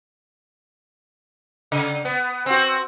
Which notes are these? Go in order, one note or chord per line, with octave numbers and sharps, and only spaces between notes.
C#3
B3
C4 F#4